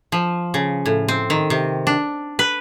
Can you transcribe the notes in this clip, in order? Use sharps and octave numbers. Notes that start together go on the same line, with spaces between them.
F3
C#3
A2
C4
D#3
C3
D4
B4